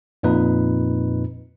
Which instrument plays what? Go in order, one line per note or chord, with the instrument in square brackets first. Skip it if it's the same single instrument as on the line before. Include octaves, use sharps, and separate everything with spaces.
[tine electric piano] F2 A#2 D#4 B4